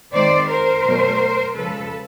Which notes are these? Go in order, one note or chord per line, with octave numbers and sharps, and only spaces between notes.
D#3 G#3 C4 C5 D5
A#4 C5
B2 F#3 A3
C#3 F3 G#3 A4 B4